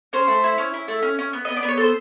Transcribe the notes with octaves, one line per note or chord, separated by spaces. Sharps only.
C#4 C5
A3
E4
C#4
E4
A3
C#4
C#4
B3
B3 D#5
D5
B3
C#5
A4 C5